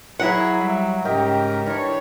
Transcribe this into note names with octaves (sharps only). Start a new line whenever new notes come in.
F#3 E4 G#4 F#5 A#5
G3 E5
G#2 C#3 D#4 G4 A#4 G5
E3 D4 C#5